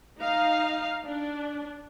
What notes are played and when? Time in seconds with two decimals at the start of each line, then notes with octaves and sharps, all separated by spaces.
0.20 D#4 F5
1.05 D4